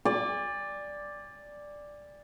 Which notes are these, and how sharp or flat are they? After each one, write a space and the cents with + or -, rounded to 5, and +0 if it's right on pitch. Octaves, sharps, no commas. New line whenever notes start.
D5 +0 G#5 -45